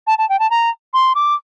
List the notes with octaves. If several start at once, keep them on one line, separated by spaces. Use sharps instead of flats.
A5
A5
G5
A5
A#5
C6
D6